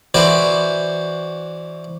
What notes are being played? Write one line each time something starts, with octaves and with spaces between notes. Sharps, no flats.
E3 F#4 B4 C5 D5